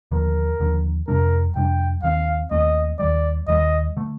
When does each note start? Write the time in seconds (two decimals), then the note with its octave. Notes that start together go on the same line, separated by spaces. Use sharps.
0.11 D#2 D3 F3 A#4
0.60 D#2 D3 F3
1.08 F2 C3 G3 D4 A#4
1.55 F2 C3 G3 D4 G5
2.03 D#2 D#3 A3 C4 F5
2.51 D#2 D#3 A3 C4 D#5
2.99 D#2 D#3 G3 D5
3.47 D#2 D#3 G3 D#5
3.97 D3 A3